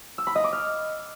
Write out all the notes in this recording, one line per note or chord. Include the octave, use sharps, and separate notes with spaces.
E6
B5
D#5
D6
F6